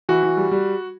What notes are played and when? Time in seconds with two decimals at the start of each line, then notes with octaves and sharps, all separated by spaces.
0.09 E3 F#4
0.23 E3
0.37 G3
0.51 G3